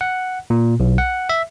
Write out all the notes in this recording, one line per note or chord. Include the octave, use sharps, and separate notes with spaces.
F#5
A#2
B1
F#5
E5